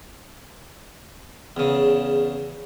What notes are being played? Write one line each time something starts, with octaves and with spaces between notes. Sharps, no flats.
E2 C#3